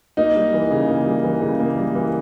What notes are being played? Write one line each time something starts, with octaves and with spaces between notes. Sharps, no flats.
A#3 D#4
G3
E3
C#3
A#3
G3
E3
C#3
A#3
G3
E3